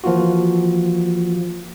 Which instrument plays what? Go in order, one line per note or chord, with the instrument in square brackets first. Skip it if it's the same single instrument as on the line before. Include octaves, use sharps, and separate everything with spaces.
[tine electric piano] E3 F3 A#3 F4 F#4